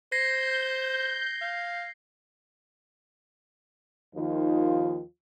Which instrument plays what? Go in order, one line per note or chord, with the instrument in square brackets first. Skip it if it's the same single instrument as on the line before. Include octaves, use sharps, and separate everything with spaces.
[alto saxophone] C5 [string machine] G6 [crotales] G#6 A#6 C7
[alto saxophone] F5
[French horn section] D#2 D#3 F3 D#4 F4